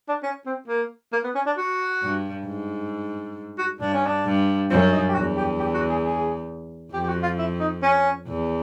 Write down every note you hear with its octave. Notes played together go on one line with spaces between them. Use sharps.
D4
C#4
C4
A#3
A#3
B3
C#4
D4
F#4
G2
G#2
F#4
G2 D4
C#4
D4
G2
F#2 C4
C#4
D#4
G4
E2 F#4
G4
G4
F#4
G#4
G#4
F2 G4
G4
F#4
F4
E4
D#4
C#4
E2